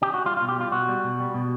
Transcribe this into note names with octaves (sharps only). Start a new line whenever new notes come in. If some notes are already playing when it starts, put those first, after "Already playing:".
G4
F#4
G3 F4
F4
B2
G4
G3 F4
B2 F#4
G3
B2
G3
B2